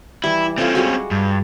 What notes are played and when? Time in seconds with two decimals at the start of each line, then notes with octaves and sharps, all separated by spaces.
0.24 E3 G3 E4
0.58 C4 C#4 F4 A4 D5
0.75 G3 G#3 F#4
1.11 G2